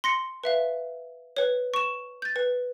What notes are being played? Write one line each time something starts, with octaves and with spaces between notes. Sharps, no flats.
C6 A#6 C#7
B4 E5 F5
B4 C#5
C#6 E7
G6 A6
B4